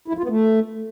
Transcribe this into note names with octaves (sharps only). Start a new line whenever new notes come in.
E4
F3
F4
B3
A3